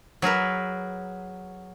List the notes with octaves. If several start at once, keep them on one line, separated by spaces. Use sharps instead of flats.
F#3 G#4 A#4 B4